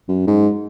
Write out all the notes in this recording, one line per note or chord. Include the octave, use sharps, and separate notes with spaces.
F#2
G#2